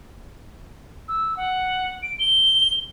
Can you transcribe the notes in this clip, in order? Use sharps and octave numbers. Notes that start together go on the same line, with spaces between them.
E6
F#5
D7
G7